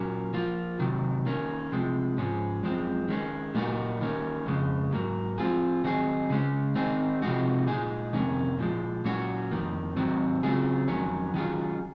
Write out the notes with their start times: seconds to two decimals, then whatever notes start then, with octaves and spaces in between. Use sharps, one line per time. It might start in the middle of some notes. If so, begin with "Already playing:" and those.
Already playing: A#2 F#3 A#3 C#4
0.34 F3 A#3 F4
0.79 C3 D#3 F#3
1.26 D#3 A#3 C#4
1.72 C3 F3 G#3
2.18 G#2 F3 G#3 C#4
2.63 F#2 F3 G#3 C4
3.09 D#3 G#3 C#4
3.55 A#2 F#3 A#3 D#4 F#4
4.01 D#3 A#3 C#4
4.46 F2 C#3 G#3
4.92 G#2 F#3 A#3
5.38 F3 C4 F4 G#4
5.84 D#3 F#3 C4 D#4 G#4
6.30 C#3 G#3 C#4
6.75 D#3 G#3 C4 D#4 G#4
7.22 C3 F3 G#3 D#4 F#4
7.67 A#2 G#3 D#4 G#4
8.13 F2 C3 D#3 A#3 C#4
8.59 A#2 F3 G#3
9.05 A#2 F#3 C#4 F#4
9.51 F2 D#3 A#3
9.97 G#2 D#3 F#3 C4
10.43 C#3 F#3 C4 F4 G#4
10.88 F2 D#3 F#3 C#4
11.34 D#3 F#3 C#4 F4 G#4